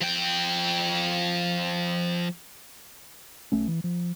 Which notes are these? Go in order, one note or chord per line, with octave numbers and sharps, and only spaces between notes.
F3 G5
B1 A3 C#4
E3
F3